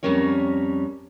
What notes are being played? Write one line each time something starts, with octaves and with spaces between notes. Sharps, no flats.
F2 D#3 G3 C#4 A#4 C#5